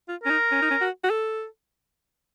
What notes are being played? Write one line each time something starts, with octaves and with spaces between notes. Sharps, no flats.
F4
C#4 A#4
D#4
C#4
D#4
C#4
F#4
F#4
A4